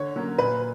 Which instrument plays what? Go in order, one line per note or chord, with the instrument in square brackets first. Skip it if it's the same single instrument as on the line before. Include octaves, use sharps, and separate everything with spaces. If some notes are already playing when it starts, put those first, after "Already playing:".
Already playing: [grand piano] D3 [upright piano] C#5
[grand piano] F#3 A#3 C#4 F#4
[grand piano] A#2 [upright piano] B4